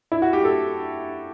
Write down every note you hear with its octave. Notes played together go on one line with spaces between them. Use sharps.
E4
F#4
G4
A4